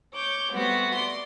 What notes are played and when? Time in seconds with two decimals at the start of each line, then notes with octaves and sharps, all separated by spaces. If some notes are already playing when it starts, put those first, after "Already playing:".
0.14 C#5 D6 G6
0.51 G3 A3 B3 C4 F#4
0.95 D5 C6